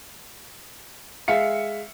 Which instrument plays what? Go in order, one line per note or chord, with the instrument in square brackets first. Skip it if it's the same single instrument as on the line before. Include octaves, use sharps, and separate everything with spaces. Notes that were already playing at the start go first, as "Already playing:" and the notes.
[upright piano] G#3 E5 F5 C#7